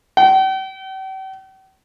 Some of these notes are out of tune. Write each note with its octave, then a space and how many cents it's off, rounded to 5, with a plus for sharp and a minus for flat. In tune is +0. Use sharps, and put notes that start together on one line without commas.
G5 -45